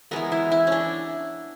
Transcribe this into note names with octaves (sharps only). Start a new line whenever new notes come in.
E3 G#3 B3 A#4
E4
E4
C#4 D4